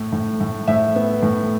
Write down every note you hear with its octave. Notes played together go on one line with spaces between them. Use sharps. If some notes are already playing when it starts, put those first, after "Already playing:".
Already playing: A2
A2
A2
A2 E5
B3
A2